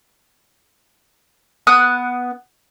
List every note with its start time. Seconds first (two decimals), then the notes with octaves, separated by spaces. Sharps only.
1.67 B3 D#6 F#6